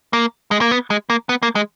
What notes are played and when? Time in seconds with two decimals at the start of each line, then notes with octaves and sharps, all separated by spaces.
0.13 A#3
0.51 G#3
0.61 A#3
0.71 B3
0.90 G#3
1.10 A#3
1.29 B3
1.43 A#3
1.55 G#3